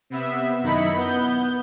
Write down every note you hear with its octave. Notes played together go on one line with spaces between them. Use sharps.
C3 B3 E5
F#2 D#3 D#4 E4 B5 C#7
B3 G6